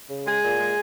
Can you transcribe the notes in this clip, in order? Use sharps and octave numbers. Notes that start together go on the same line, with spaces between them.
C#3
G#3 G#4
A#2
G#3